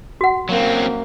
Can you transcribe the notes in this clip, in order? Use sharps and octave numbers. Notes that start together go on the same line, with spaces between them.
F#4 F#5
F#2 F#3 A#3 C4